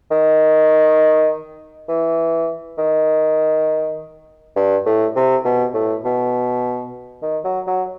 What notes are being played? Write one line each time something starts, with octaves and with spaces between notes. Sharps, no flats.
D#3
E3
D#3
G2
A2
C3
B2
A2
B2
D#3
F#3
F#3